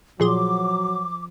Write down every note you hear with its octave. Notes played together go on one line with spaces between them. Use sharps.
A#2 F3 F#3 G#4 C6 D6